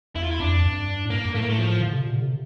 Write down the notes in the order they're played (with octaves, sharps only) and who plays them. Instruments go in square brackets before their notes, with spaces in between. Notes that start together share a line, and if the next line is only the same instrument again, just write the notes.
[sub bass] E2 [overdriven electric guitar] E4
[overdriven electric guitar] F4
E4
[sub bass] F2 [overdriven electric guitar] D4
[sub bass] G2
A2
[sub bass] G2 [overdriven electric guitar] A#3
[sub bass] G2
[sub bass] A2 [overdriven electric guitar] A3
[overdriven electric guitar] A#3
A3
F3
[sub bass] D3
C3
A#2
D3
C3